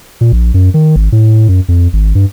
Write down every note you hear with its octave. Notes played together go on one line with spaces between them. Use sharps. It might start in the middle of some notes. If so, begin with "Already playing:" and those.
A#2
A#1
F#2
D#3
G#1
A2
F#2
F2
G#1
G2